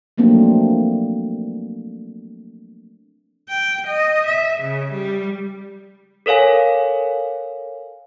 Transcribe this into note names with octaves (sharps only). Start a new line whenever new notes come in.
F3 F#3 A3 A#3 C4 D4
G5
D#5
E5
C#3
G3
A4 A#4 C#5 F5 G#5